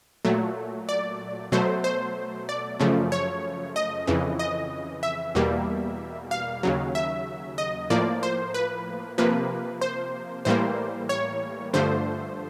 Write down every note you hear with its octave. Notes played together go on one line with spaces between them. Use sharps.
A#2 F#3 A3
D5
B2 F#3 A3 C5
C5
D5
F#2 C#3 F3 A3
C#5
D#5
F2 C#3 E3
D#5
E5
E2 B2 G3 A#3
F5
D#2 C#3 F#3
E5
D#5
A2 F3 A#3 D5
C5
B4
C3 F3 A#3 B4
C5
A2 E3 G3 A#3 C5
C#5
G2 D3 F3 A3 C5